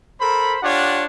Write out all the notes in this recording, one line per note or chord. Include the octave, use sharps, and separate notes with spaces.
A4 A#4 C5 B5
D4 F4 G4 C#5 F#5